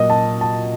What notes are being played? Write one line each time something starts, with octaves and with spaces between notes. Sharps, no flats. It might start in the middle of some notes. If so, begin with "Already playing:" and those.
Already playing: A#2 F#3 A#3 D#5
A5
A5